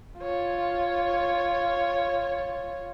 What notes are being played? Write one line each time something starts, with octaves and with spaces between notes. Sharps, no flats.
F4 C#5